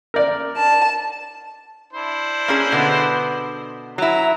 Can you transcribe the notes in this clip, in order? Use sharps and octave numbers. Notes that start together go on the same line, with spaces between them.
A#4 D5
A5
D4 E4 C5
A#3 C#4 G#4
B2 D3 B3
F#3 E4 A#5